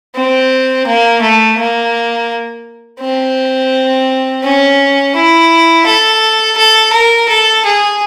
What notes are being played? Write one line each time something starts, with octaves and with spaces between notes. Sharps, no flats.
C4
A#3
A3
A#3
C4
C#4
E4
A4
A4
A#4
A4
G#4